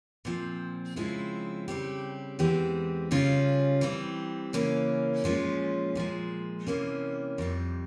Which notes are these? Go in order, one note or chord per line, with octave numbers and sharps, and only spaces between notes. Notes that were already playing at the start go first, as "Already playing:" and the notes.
A#2 F3 C4
C#3 F3 G#3 C4 E4
C#3 G3 C4 G4
E2 E3 G#3 C4 G4
C#3 G3 C#4 F4
E3 G3 C4
C#3 E3 A#3 C#4
A#2 F3 G#3 C#4 F4
A#2 F3 G#3
C3 E3 A#3 C#4
F2 C3 G3